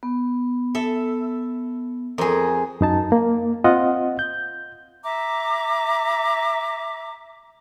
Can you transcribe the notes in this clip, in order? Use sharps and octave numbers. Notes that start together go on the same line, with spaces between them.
B3
A4 E5
F2 G#4 A#4 A#5
F#2 D#4 A5
A#3
C4 F4 D#5 F#5
G6
E5 A#5 D6